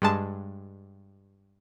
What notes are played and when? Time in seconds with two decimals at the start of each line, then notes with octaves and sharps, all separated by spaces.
0.02 G2 G#3 A5